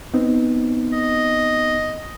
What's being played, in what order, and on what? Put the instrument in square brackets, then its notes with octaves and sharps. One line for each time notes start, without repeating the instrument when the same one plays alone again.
[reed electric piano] B3 C4 D#4
[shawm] D#5